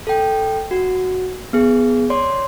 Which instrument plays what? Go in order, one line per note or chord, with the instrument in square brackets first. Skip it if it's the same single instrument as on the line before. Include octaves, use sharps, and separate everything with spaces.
[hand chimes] A4 G5
F#4
B3 G#4
C#5 D5 C6